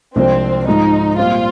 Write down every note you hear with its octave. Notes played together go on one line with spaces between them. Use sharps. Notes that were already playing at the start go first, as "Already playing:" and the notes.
C2 C3 F3 G#3 C4 D4
G#2 F3 G#3 D#4
A#2 G3 C4 F4 G4